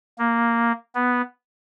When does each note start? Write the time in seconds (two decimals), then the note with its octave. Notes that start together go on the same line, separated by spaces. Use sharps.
0.18 A#3
0.95 B3